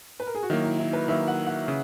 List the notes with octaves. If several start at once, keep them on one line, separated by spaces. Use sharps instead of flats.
B4
A#4
G#4
F#4
D#3 F#3 A#3 E4
E4
E4
B4
D#3 F#3 A#3 E5
F#5
F#5
C#3